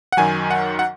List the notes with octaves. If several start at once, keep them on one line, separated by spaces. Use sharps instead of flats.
F#5
F#2 D#3 F#3 G#5
F#5
F#5